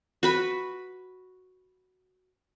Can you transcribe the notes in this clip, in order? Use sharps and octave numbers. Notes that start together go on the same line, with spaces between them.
F#4 B4 B5